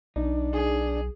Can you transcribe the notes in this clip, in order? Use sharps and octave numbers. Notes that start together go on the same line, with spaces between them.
B1 D4 D#4
G#4